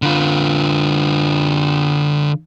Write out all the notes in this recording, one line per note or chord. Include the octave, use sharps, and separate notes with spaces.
D3 F4